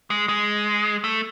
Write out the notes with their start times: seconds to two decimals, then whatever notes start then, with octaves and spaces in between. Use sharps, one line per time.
0.10 G#3
0.29 G#3
1.04 A3